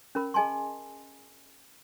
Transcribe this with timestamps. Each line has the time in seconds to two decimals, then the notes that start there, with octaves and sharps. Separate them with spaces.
0.15 C#4 A#4 B5
0.34 G#4 D#5 G#5 A5 C6